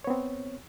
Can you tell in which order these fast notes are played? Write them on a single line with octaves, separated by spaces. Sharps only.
C#5 B3 C4